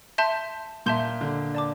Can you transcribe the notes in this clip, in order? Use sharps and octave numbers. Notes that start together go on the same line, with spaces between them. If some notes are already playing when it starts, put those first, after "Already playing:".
E5 A5 C6 G6
A#2 E5 A5 C6 G6
D3
D5 A5 D6